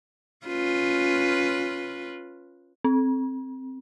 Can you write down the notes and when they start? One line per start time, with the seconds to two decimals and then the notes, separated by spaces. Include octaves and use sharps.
0.47 C#4 F4 B4
2.84 C4